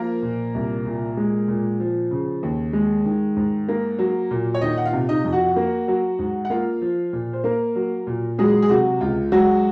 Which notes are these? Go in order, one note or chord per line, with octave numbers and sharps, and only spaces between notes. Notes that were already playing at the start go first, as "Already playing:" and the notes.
Already playing: F3 A#3 A#4
A#2
C2
A#2
G#3
A#2
F3
C#3
D#2
G#3
D#3
G#2
A#3
F#3
A#2
C#5
D#3 D#4 D#5
F#5
F4 F5
C3
D#4 D#5
F2
F#4 F#5
A#3
F#3
G#2
F#5
A#3 F4 F5
F3
A#2
C5
A#3 A#4
F#3
A#2
F#3 G#3 G#4
G#4
C3 F#3 F#4
C#2 F4
F#3 G#3 F#4